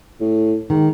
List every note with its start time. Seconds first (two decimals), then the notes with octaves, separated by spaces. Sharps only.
0.20 A2
0.70 G#2 D#3